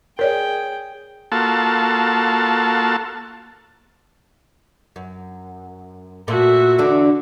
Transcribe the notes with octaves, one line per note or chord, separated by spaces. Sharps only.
G#4 A#4 C#5 D5 G5
A#3 F4 F#4 A4 A5
F#2
A#2 A3 F#4 E5
E2 D3 D4